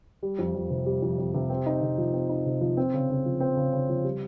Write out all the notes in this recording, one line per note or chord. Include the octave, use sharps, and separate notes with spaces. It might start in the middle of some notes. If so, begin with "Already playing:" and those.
G3
F2
F2
C3
G3
F2
F2
C3
C4
D#4
C3
F3
C4
D#4
C3
F3
C4
C#3
C#3
F3
C4
C#3
C#3
F3
G3